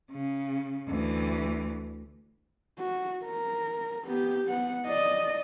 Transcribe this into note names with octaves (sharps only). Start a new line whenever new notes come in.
C#3
D2 E3
F#4
A#4
B3 G4
B3 F#5
D5 D#5